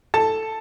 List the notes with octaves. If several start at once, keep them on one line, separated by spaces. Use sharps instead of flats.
A4 A5